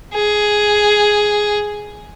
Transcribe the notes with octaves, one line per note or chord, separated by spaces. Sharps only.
G#4